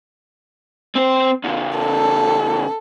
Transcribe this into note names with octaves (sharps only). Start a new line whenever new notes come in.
C4 C5
E2 C#3
A4